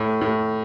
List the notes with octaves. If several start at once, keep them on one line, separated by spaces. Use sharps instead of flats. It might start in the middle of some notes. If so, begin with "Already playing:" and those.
Already playing: A2
A2